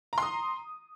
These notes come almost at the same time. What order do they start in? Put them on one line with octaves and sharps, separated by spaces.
A#5 C6 D#6